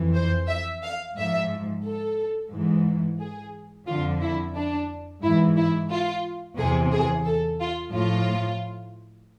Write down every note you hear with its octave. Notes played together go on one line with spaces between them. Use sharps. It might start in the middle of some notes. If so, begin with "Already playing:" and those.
Already playing: F2 E3
C5
E5
F5
G#2 F3 E5
A4
G#2 E3
G#4
F2 D3 F3 F4
E4
D4
G#2 E3 E4
E4
F4
E2 C3 E3 G#4
G#4
A4
F4
A2 F3 F4